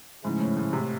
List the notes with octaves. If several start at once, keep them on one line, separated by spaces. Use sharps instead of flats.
G#2 C#3 F3 A3 C#4 E4
A2
A2
C3